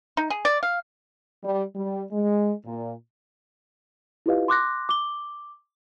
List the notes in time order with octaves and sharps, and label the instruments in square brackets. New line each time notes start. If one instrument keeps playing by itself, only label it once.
[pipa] D#4
G#4
D5
F5
[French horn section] G3
G3
G#3
A#2
[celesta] E4 F4 G4 B4 D#5 F5
C6 D6 F#6 A#6
D6 G7